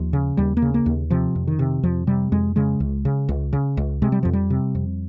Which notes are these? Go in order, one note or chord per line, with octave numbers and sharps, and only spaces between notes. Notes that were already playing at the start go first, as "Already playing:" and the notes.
Already playing: D#2 F3
C#3
D#2 G3
A#3
C#3
A#3
D#2
C3 F3
F2
D#3
C3
F2 F3
C3 G3
F2 G#3
C#3 G#3
C#2
C#3
C#2
C#3
C#2
C3 G#3
G3
F2 F3
G3
C3
F2